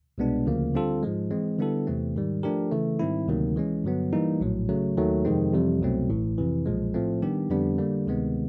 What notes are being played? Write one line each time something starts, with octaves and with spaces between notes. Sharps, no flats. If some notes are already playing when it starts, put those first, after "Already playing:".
C2 B2 G#3 B3 D4
D2 C#3 F3 A#3
D3 G3 C4 F4 A4
G#2 F3 G#3
E3 G#3 C4
D3 G3 B3 E4 A4
E2 C3 E3 A3 C4
G#2 D#3 G3
F3 A3 D4 G4 A#4
C#3 E3 A3
G#2 D#3 G3 C4 E4
D2 C3 D#3 F#3 A#3
E3 G#3 C#4
G2 D3 F#3 B3
E3 G3 A#3 D#4
A#1 A2 F#3
C#3 F#3 A3
D#2 D#3 F#3 A3
F2 C3 D#3 G#3 C4
F2 C3 E3 G3
C2 B2 F#3 A3 C4
A1 A2 E3
F2 C3 E3
B1 A#2 F3 G#3
A2 F3 A3 C4
D#3 G3 B3 D4 G4
F2 D3 G3 B3 D4
D3 G3 A#3
D2 C3 D#3 G#3 B3